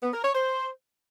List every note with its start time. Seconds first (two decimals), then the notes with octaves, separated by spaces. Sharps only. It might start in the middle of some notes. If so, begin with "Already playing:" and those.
0.02 B3
0.13 A#4
0.24 C#5
0.35 C5